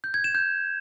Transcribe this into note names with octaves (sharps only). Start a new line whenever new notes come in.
G6
G#6
E7
G6